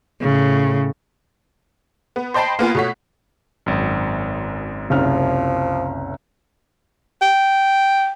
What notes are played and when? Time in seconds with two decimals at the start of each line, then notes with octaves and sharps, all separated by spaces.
0.21 A2 C#3
2.16 B3
2.34 C5 D#5 G5 A5 B5 C7
2.59 A#3 B3 F4 G#5
2.75 B2 A3 C#5 F#5 B6
3.66 G#1 F#2
4.90 F#1 C2 F3 F6
7.22 G5